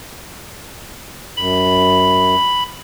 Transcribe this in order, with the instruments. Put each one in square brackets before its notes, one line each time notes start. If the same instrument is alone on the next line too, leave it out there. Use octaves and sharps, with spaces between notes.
[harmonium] F#2 [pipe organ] B5